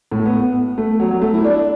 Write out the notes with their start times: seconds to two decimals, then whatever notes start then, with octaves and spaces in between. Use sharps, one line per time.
0.12 A2
0.20 A3
0.25 B3
0.41 B3
0.78 A3
1.00 F#3
1.11 F#3
1.22 A3
1.33 E4
1.44 D4